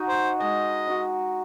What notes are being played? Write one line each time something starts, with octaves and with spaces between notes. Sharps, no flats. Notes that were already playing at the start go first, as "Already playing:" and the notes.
Already playing: D#4 F#4
C5
G#3 D#5
D#4 F#4